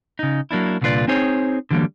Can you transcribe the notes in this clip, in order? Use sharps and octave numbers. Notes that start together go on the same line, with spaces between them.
C#3 D#4
F#3 A#3 D4 E4
C2 A#2 D3 F4 B4 D5
C4 D#4 G#4 C5 C#5
D3 E3 F#3 G3 A#3